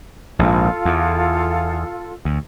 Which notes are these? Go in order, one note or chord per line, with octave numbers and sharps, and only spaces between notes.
A#1 G#2 F4 A4
E2
D2